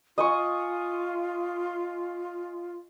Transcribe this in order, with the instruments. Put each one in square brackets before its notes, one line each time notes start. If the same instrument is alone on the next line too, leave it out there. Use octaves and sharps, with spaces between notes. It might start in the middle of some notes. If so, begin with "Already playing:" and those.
[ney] F4 [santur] D#5 G#5 C#6